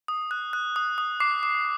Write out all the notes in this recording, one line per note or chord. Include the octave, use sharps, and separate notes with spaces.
D#6
F#6
F#6
D#6
D#6
D6 C7
D6